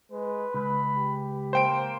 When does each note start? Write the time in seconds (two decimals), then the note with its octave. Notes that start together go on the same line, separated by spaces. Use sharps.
0.12 G#3 B4
0.54 C#2 B5
0.97 G4
1.53 A#3 C5 G5 D7